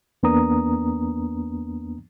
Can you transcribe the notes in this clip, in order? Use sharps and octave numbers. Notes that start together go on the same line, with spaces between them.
E2 A#3 B3 D4 A#5 D#6